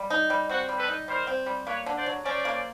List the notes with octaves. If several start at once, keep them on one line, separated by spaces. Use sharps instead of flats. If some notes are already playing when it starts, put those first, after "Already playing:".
Already playing: G3
D#4
G3
C4 F#4
G3
A4 B4
D#4
G3 A#4 C5
C4
G3
A#3 B4 C#5
D3
C5 D5
F#3
C#4 C5 D5
A#3